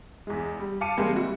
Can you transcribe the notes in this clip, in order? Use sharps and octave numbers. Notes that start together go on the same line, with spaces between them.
E2 G#3
G3
F5 A5 D6 C#7 D#7
C#3 E3 G3 G#3 A#3 C4
G3 E4 F#4